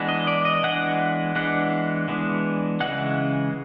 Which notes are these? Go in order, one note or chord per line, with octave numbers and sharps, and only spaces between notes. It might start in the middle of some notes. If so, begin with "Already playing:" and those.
Already playing: E3 G#3 B3 D4
D#5
D5
D#5
E3 G#3 B3 D4 F#5
E3 G#3 B3 D4 F#5
E3 G#3 B3 D4
C#3 E3 G#3 F#5